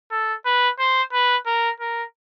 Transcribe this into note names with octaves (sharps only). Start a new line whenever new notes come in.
A4
B4
C5
B4
A#4
A#4